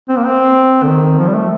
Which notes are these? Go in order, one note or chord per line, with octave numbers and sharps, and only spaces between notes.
C4
A#3
C4
D3
D#3
F3
G3
A3